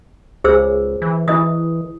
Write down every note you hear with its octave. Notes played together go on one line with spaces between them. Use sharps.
C#2 G#4 C5 E6
E3
E3 E4 D#5 D#6